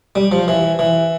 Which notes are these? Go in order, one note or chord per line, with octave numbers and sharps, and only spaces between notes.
G3
F3
E3
E3